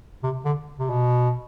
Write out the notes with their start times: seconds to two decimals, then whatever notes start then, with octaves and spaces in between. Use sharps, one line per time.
0.23 C3
0.45 D3
0.79 C3
0.90 B2